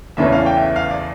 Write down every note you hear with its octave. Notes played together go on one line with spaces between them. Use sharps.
E2 C#3 E3 A3 C#4 E5
F5
G5
E5
F5
D5